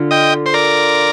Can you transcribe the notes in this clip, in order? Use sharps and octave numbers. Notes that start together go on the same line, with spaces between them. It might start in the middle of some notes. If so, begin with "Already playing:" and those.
Already playing: D3 F4
D#5 G5
C5
A#4 D5